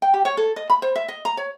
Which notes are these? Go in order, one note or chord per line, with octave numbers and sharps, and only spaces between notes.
G5
G4
C#5
A4
D#5
B5
C5
E5
D#5
A#5
C#5